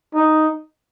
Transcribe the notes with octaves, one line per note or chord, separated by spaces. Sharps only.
D#4